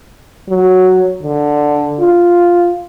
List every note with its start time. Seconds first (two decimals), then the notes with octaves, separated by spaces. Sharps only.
0.49 F#3
1.22 D3
1.99 F4